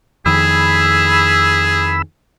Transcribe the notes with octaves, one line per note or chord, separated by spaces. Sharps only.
F2 D#3 G#4 B5 E6